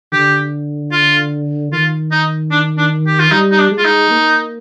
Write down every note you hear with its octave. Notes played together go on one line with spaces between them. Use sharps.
D3 G4
F4
D#3 F4
D#4
D4
D4
G4
F4
G3 D#4
D#4
D4
G#3
F4
D#4
A#3